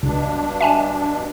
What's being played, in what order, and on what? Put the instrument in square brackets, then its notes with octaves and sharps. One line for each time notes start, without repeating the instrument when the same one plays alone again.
[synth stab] C#2 [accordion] G2 B2 D4
[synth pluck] E5 G#5 A5